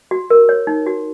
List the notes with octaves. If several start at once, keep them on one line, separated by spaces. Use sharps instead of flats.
F#4
A#4
C#5
D#4
F#4